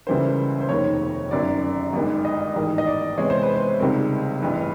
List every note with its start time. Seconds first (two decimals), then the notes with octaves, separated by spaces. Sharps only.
0.07 C#2 C#3 E3 G3 A#3 C5
0.61 C5
0.69 F1 D#2 D#3 C#5
1.31 G1 F#2 D#3 F#3 D5
1.93 G1 G2 D#3 G#3
2.25 D#5
2.56 A1 G#2 D#3
2.78 D#5
2.87 D5
3.18 E2 C3 E3 G#3 C#5
3.30 C5
3.43 B4
3.56 C5
3.80 C#2 C3 D#3 G3 C4 A#4
4.42 A1 G2 E3 B4